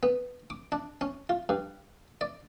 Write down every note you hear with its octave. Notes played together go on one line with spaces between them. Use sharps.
B3
D6
D4
C#4
F4
G2
D5